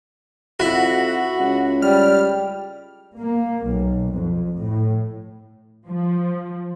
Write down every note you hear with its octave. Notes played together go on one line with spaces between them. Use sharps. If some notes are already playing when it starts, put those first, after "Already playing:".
F2 E4 F#4
C#2
G3 F6
A#3
B1
F2
A2
F3